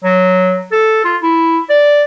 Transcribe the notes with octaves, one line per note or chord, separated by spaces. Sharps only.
F#3
A4
F4
E4
D5